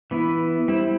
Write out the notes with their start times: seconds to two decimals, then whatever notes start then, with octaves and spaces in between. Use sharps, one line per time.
0.11 E3 B3 E4
0.68 G3 C4 E4